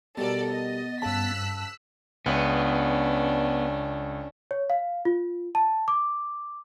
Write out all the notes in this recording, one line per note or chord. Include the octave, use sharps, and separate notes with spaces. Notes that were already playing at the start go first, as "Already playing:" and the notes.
B2 G3 B3 A4 A#4 D5 A6
D#5
G2 C#3 A5 E6 F#6 B6
C#2 B3 C#4 D4
C#5
F5
F4
A5
D6